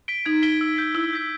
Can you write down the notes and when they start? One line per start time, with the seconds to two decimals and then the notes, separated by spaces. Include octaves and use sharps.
0.08 B6 D7 G7
0.26 D#4 G#6
0.42 B6 D7 G7
0.61 E6
0.78 G6 B6
0.95 E4 E6
1.13 G6 B6